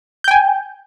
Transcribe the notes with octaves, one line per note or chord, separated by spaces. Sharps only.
G5 G#5 G6